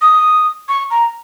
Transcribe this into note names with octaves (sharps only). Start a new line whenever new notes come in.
D#6
C#6
A#5